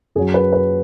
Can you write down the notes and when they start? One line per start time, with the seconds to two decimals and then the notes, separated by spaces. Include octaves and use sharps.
0.15 F#2 G#4
0.19 F#3
0.34 B4
0.53 B4